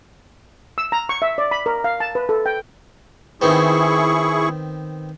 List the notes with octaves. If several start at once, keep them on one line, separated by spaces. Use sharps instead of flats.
E6
A#5
C#6
E5
D5
B5
A#4
F5
A5
B4
A4
G5
D#3 B3 C4 E4 G#4 C#6